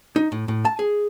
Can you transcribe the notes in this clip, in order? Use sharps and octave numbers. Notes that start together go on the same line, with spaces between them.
D#4
A2
A2
A5
G#4